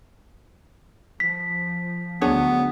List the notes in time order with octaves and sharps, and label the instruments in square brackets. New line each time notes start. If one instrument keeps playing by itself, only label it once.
[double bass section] F3 [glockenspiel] B6
[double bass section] D2 F#3 [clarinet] B3 [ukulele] D4 G#4 C#5